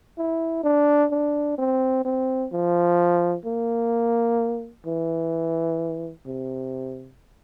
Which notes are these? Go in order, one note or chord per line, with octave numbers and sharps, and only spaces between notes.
E4
D4
D4
C4
C4
F3
A#3
E3
C3